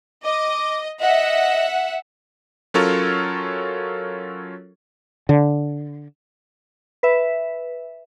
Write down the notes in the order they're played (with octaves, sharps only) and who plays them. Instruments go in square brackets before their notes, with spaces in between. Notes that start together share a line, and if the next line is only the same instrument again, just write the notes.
[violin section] D#5 [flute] D6
[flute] D#5 [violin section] E5 F#5
[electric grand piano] F#3 C#4 F4 A4 A#4 C#5
[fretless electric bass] D3
[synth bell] B4 E5